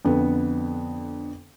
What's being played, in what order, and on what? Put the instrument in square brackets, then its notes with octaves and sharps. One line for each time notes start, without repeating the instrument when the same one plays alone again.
[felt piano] F2 D3 B3